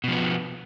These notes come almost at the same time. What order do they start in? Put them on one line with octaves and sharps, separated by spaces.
B2 F3 B3